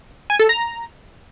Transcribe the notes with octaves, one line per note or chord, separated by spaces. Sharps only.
G#5
A4
A#5